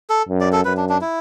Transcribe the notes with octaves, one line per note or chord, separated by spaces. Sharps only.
A4
F#2
D5
A4
F#2 B4
D4
D4
E4